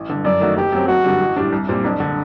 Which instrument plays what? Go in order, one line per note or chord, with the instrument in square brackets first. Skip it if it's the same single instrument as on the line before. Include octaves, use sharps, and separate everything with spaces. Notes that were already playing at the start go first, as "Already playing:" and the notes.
Already playing: [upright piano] A1
G2 D3
[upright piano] F#2 [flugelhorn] D5
[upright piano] D#3 A3 D#4 F#4
[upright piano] F#1 [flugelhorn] G4
[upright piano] F#2 F#3 C4
[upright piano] F#1 [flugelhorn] F#4
[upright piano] F#2 D3 G3
A1
A2 G3 D4
C2
A#2 G3 C4
[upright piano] F#1 [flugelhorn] D4
[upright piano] D3